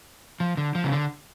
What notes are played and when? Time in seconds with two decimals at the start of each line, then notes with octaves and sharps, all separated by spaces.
0.40 F3
0.57 D3
0.75 F3
0.84 C#3
0.92 D3